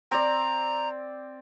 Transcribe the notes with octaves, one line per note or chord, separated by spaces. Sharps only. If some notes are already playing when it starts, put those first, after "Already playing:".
C4 D5 A#5